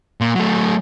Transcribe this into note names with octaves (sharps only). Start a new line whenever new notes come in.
A#2
F#3 A3